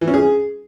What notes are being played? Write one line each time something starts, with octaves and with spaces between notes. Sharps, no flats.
E3
C#4
G#4